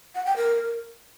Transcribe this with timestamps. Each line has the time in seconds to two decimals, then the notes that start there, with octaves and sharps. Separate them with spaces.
0.15 F#5
0.26 G5
0.37 A#4